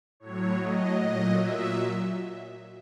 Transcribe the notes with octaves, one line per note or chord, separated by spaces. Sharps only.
A2 F#3 C#5
D#5
A#2 F#3 D#5
E5